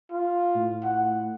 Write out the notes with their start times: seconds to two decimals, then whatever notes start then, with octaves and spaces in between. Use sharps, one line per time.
0.12 F4
0.56 A2
0.84 F#5